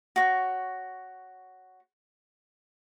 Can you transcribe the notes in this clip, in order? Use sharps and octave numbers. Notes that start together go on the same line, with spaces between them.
F#4 C#5